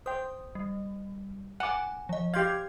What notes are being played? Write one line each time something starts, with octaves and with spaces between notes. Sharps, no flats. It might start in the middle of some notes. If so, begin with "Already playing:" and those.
C5 G5 D#6
G3
F#5 G#5 D6
F3 D#5
G4 F5 C6 G6 G#6